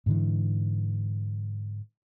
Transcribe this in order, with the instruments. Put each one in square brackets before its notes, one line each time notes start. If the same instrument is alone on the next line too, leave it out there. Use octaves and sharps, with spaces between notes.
[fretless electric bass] G#2 D3 E3